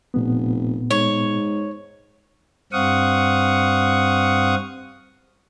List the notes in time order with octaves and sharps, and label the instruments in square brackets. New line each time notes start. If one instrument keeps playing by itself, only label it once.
[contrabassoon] F1 [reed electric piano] A#2 B3
[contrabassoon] G#2 [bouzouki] C#5
[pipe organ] G2 C4 F5 F#5 C#6 D#6